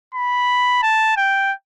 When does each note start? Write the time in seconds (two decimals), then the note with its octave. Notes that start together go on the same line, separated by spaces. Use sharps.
0.15 B5
0.83 A5
1.17 G5